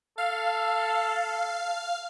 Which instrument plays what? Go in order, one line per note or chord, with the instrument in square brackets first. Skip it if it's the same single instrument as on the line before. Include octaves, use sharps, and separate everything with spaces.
[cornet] A4 [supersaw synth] F5